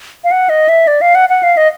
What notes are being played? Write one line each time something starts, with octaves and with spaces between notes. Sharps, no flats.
F5
F#5
D#5
E5
D5
F5
F#5
F#5
F5
D#5